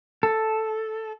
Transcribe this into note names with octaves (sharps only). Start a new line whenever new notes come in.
A4